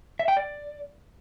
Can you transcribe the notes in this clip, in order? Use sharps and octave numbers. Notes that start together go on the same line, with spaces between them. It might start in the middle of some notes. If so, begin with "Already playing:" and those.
E5
G5
D5